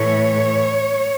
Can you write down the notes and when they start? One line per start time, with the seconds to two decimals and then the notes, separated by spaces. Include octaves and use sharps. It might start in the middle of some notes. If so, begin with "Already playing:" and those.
Already playing: A2 E3 A3 C#5